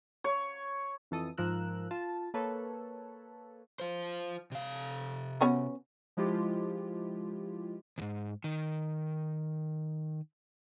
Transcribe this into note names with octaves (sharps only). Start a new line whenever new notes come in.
C#5
F2 E3 A4 D#6
G#2 F3 F4 A#4 E6 F#6
F4 A5
A#3 A4 B4 C#5
F4 C5
C3 F5
B3 C#4 F#4
F3 G#3 E4 F4 G4
D2 G#2
D#3